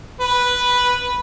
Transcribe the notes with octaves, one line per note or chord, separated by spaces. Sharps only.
B4